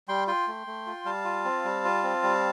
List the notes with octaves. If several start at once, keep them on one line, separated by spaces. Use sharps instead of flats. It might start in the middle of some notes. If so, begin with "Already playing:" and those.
G3 G5 C6
F4 G5 C6
A3
A3
F4
G3 F5 A5
F4
C4
G3
F4
C4
G3